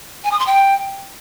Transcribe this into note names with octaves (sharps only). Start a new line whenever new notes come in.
G#5
D#6
C6
G5